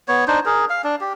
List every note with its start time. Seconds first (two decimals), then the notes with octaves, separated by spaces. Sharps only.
0.08 B3 C#5
0.28 D4 D#4 C5
0.45 G#4 A#4
0.70 F5
0.84 D4
1.01 G4